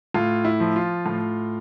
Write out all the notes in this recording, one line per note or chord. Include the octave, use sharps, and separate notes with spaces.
A2 F4
E4
F3
F4
A2